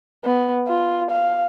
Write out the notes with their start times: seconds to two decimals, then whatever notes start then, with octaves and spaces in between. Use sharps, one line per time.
0.25 B3
0.68 F4
1.11 F5